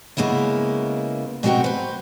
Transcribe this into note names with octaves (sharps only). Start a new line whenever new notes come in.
C#3 G#3 A#3 B3 E4
B2 G#3 C4 F#4 A#4 G5
B4 C5